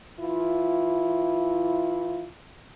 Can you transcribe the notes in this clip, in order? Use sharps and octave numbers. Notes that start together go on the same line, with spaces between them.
E3 E4 F4